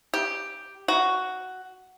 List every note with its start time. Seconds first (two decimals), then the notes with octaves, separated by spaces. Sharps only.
0.14 G4
0.88 F#4